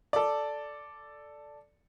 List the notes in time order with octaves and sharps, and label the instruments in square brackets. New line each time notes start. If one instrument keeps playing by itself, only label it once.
[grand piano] A4 D5